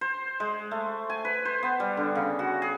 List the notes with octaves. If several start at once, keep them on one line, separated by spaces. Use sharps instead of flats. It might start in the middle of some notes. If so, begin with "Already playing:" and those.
C5
G#3
A3
G#5
B4
C5
B3
G3
D3
C#3
F#4
G#4